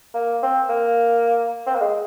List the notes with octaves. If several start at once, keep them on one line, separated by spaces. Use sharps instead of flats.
A#3
C4
A#3
C4
A#3
G#3